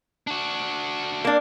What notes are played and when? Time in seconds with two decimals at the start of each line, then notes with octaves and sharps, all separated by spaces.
0.27 D4 F#4
1.25 A#3 D4